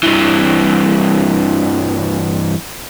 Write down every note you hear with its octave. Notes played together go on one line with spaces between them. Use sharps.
G2 E3